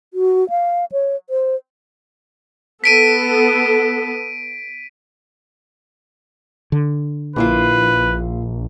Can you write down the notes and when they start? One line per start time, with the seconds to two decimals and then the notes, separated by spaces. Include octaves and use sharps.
0.14 F#4
0.50 F5
0.92 C#5
1.30 C5
2.84 B3 A4 B6 D7 D#7
6.72 D3
7.36 A#1 A#3 E4 F4 B4